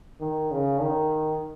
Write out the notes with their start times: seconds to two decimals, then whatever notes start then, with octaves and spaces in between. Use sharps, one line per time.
0.20 D#3
0.51 C#3
0.81 D#3